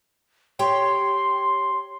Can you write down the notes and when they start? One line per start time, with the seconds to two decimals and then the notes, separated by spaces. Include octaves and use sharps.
0.59 G4 C#5 G5 C6